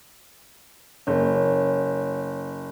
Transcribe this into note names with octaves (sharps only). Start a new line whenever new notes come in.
F#1 C#5